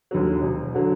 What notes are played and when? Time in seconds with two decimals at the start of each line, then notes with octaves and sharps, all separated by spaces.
0.11 D#2 D3 F#3
0.42 E1
0.74 D3 F#3